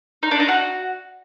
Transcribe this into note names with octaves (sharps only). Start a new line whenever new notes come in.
D#4
D4
D#4
F#4